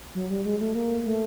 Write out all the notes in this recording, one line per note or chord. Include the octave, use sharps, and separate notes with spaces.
F#3
G3
G#3
A3
A#3
A3